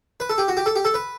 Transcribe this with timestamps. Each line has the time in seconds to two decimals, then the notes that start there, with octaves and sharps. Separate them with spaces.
0.20 B4
0.29 A4
0.38 G4
0.48 F#4
0.57 G4
0.66 A4
0.76 G4
0.85 A4
0.94 B4